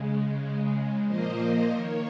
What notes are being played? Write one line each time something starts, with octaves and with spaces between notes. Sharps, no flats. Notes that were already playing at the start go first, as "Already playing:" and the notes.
Already playing: C#3 G#3
C#3 G#3
A#2 F3 A#3 C5 D#5
D#3 A#3 A#4 C#5